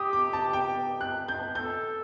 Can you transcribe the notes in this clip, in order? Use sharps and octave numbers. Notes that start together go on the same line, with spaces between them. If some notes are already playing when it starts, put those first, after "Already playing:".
Already playing: G4 D#6
D6
A5
G5
F#6
G6
A4 G6